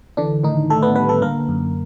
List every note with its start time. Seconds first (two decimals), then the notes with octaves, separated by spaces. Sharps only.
0.17 D3 E3 D4
0.44 A2 D#3 D#4
0.70 A2 A3 A4
0.82 B3 B4
0.95 G3 B3 B4
1.09 A3 A4
1.22 D3 A#3 A#4
1.49 F#2